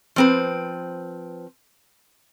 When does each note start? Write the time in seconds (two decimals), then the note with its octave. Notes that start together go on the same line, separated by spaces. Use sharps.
0.16 F3 C4 B4